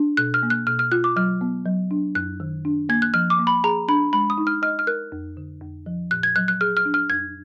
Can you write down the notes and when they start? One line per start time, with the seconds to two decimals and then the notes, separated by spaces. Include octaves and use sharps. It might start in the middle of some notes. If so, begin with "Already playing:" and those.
Already playing: D4
0.17 B2 F#6
0.34 F6
0.43 A#3
0.50 F#6
0.67 B2 F6
0.79 F6
0.92 F4 F#6
1.04 D6
1.16 F#3 F6
1.41 B3
1.66 F#3
1.91 D4
2.15 F#2 F#6
2.40 D#3
2.65 D4
2.89 A#3 G#6
3.02 F#6
3.14 F3 F6
3.30 D6
3.39 A#3
3.47 B5
3.64 G#4 A#5
3.88 D4 B5
4.13 G#3 B5
4.30 D#6
4.38 D#4
4.47 F6
4.62 D#5 F6
4.79 F6
4.87 A#4 F#6
5.12 F2
5.37 D3
5.62 F2
5.86 F3
6.11 A#2 F#6
6.23 G#6
6.36 F#3 F#6
6.48 F#6
6.61 G#4 F6
6.77 F6
6.85 D4
6.94 F6
7.10 F2 G#6